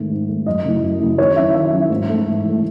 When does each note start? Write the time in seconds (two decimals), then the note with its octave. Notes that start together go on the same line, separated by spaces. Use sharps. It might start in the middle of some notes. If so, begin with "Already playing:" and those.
Already playing: G#2 D#3 A3
0.10 G#2
0.29 D#3 A3
0.46 F#2 D#5
0.64 C#3 F#3 A3 E4
0.82 F#2
1.00 C#3 F#3 A3 E4
1.18 D#3 C#5
1.36 F#3 C#4 E4 E5
1.54 D#3 E5
1.72 F#3 C#4 E4
1.90 G#2
2.08 E3 A3
2.26 G#2
2.44 E3
2.49 A3